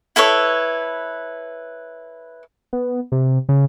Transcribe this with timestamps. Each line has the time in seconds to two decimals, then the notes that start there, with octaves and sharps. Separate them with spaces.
0.16 E4 A4 B4 C#5
2.73 B3
3.12 C3
3.49 C#3